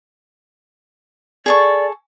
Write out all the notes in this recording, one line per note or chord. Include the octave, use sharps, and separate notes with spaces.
G#4 A4 D5 C#6